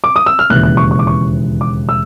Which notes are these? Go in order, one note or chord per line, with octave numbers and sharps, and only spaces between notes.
D6
D#6
E6
F6
E1 D#2 C#3 E3 F#6
F#6
C#6
C#6
D6
C#6
D6
E6